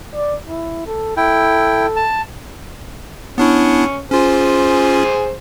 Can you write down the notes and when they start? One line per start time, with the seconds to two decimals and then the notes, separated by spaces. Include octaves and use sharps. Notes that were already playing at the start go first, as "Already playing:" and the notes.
0.14 D5
0.48 E4
0.86 A4
1.17 E4 A4 G5
1.96 A5
3.38 B3 C#4 D4 E4
4.11 C#4 F4 G#4 C5